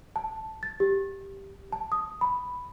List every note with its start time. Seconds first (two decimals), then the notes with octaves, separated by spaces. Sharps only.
0.16 A5
0.63 A6
0.80 G4
1.72 A5
1.92 D#6
2.21 B5